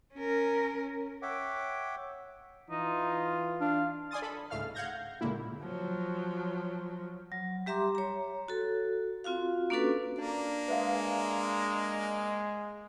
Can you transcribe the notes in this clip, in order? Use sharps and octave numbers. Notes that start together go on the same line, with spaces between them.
C#4 A#4
C#5 E5 F#5 G5 D6
E3 D#4 F4
D4 F5
D5 G#5 C6 D#6 A6
A4 B5
C#2 G#2 A3 F5 F6
F5 F#5 F6 G6 G#6 A#6
G1 C#2 A#2 D3 A#3 E4
F3 F#3
F#3
G3 G4 E5 A#5 C6 D6
C#5 A#5
F#4 A4
C4 F4 F#4 F5
A#3 C#4 D4 F#4 A4 B4
A#3 D4 D5
G#3 B4 E5 F5